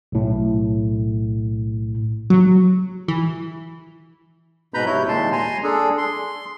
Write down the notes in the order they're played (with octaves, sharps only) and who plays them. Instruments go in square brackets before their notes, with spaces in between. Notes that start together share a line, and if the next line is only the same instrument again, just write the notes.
[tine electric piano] B1 A2
[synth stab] F#3
E3
[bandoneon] G#2 B2 B4 A#5 B5 G6
C3 E4 C#5 G6
D#2 A#2 G#3 A5 C6
G#5 A#5 C6
D4 G#4 A4
C6